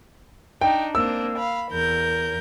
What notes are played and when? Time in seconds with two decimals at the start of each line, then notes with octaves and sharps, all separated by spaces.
0.61 D4 D#4 G5
0.95 A#3 C4 D4 E6
1.37 F5 B5
1.71 E2 A#4 G6